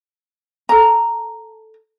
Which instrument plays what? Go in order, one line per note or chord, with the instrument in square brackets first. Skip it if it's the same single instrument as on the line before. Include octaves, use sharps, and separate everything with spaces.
[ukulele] A4 A#5